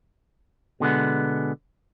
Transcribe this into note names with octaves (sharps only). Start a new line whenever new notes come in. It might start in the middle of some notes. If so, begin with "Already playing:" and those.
B2 D3 G#3 B3